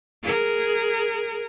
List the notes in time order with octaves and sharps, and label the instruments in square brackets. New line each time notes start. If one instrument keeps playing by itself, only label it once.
[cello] G#4 A#4